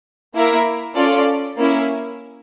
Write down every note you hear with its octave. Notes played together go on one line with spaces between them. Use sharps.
A#3 E4 A#4 E5
C#4 F4 A4 D5
A#3 C#4 E4